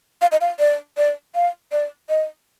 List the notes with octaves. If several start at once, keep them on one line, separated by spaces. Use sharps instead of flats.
F5
D#5
F5
D5
D5
F5
D5
D#5